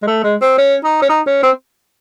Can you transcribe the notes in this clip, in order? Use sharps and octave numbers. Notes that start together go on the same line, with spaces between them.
G#3
A3
G#3
C4
C#4
D#4
C#4
D#4
C#4
C4